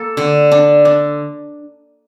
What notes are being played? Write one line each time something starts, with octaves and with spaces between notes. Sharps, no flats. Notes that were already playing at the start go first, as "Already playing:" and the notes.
Already playing: A#3 A4
D3
D4
D4